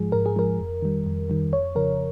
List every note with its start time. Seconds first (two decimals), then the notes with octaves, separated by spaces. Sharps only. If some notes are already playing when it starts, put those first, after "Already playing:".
Already playing: G#2 F3 G#3 G#4
0.12 G#2 A#4
0.26 G#4
0.36 F3 G#3 A#4
0.59 F2
0.82 D#3 G3
1.06 F2
1.30 D#3 G3
1.52 F2 C#5
1.75 C#3 F3 A#4